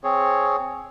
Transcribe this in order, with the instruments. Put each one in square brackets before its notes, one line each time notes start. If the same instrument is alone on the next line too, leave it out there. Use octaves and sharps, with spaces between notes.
[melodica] C4 G#4 C#5